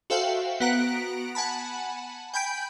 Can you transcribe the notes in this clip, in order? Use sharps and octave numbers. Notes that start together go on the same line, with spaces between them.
F#4 A4 C5 E5 F5 G5
B3 F#4 F#5 A#5 B6 D7
F#5 G#5 A5 B5
G5 G#5 B5 G6 D7